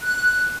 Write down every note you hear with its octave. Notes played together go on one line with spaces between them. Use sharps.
F#6